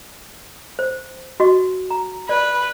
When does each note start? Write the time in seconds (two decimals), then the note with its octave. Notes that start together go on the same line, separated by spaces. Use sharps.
0.79 C5
1.40 F#4 D#5 C#6
1.91 A#5
2.29 B4 D5